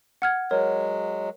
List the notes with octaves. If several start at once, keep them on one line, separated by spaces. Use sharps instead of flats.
F#5 F6 G#6
F#3 G#3 A#4 C#5